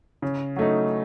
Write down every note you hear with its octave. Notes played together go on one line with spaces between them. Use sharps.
C#3
F#3 A3 D#4